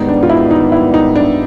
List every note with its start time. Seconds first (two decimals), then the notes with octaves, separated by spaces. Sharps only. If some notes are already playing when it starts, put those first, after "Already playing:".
Already playing: G#2 D#3 G3 B3 D#4
0.09 D4
0.23 F4
0.30 E4
0.51 D#4
0.72 E4
0.94 D#4
1.16 D4